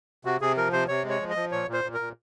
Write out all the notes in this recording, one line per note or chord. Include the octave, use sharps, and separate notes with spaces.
C3 F#4
C3 G#4
F3 A#4
C3 C5
C3 C#5
G#3
C#5
F3
D#5
F3
A#2 C#5
A#2
C5
A#2
A#4
A#2